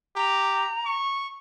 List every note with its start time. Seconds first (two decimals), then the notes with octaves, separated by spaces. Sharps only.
0.16 G4 A#5
0.86 C#6